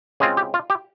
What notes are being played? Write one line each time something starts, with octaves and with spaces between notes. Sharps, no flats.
C#3 G#3 C4 F4 G#4
G4
F4
G4